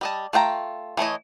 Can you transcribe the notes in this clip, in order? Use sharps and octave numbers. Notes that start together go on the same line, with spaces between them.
G3 D#5 A5
A3 F4 G5 A#5
E3 A3 C#5 D#5